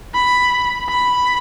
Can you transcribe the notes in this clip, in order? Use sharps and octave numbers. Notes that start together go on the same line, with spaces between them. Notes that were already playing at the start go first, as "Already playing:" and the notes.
B5
B5